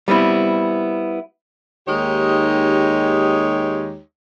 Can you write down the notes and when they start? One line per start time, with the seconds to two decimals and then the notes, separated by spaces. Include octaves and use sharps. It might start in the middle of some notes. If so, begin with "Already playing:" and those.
0.08 G3 B3 C4 E4
1.88 D#2 G#3 D#4 G4 C#5